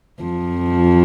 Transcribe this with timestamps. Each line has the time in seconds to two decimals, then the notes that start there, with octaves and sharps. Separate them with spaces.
0.23 F2 F3